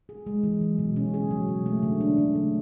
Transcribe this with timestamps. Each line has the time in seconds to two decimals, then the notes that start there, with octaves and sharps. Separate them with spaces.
0.09 G#4
0.27 G#3
0.44 E3
0.61 F#3
0.79 B2
0.96 C#4
1.14 G#4
1.31 F#3
1.49 B2
1.66 A3
1.83 D3
2.01 D4
2.18 D3
2.35 A3